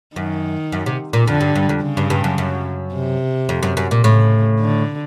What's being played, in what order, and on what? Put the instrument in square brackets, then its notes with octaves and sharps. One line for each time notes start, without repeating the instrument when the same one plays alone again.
[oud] F#2 [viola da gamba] D#3
[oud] F#2
C3
A#2
[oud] F2 [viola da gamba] D3
[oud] G2
G2
F2
[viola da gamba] C#3
[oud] G2
G2
F#2
F#2
[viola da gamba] C3
[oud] F2
F#2
F#2
A#2
[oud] A2 [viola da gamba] C#3
[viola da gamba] D3